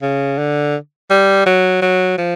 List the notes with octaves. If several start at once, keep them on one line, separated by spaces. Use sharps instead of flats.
C#3
D3
G3
F#3
F#3
F3